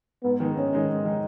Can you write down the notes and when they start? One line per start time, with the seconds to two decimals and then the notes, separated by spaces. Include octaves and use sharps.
0.23 G#2 B3
0.40 D#3 G#3 D#4
0.56 G#2 C#4
0.73 D#3 G#3 D#4
0.89 G#2
1.05 D#3 G#3 D#4